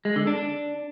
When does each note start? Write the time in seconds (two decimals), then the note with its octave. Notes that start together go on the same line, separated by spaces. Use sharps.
0.05 G#3
0.16 D3
0.27 D4